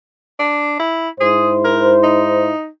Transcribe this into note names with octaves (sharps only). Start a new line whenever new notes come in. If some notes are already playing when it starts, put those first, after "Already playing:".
D4
E4
G#2 E4 G#4 C5
A#4
D#4